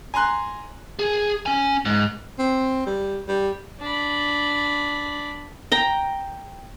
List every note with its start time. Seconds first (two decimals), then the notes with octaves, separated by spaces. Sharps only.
0.14 G#5 A#5 C6 F#6
0.99 G#4
1.46 C#4 G#5
1.86 G#2
2.39 C4
2.86 G3
3.28 G3
3.80 D4 B5
5.72 G5 A#5